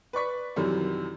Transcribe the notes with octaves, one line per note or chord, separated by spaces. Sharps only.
B4 D5 C#6 B6
F#2 C3 D#3 E3 F#3 G3